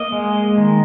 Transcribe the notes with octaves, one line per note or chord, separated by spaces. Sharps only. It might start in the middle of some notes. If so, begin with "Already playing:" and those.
Already playing: A#3 D#5
G#3
D#3